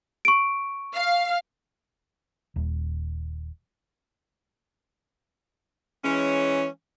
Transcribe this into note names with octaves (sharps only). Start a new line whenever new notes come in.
C#6 D7
F5
D#1
E3 G#3 C#4